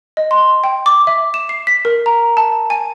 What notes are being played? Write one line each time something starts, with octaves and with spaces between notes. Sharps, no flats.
D#5
C6
G5
D6
E5
E7
C7
B6
A#4
A#5
A5
G#5